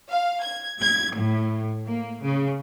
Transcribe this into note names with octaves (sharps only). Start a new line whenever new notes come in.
F5
G#6
G#6
A2
A#3
C#3